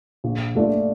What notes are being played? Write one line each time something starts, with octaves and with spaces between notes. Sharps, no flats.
A#1
A#2 A3 D4 F4